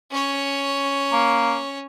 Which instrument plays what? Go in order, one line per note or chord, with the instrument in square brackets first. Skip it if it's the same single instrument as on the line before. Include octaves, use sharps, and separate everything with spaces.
[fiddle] C#4 C#5
[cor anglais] A#3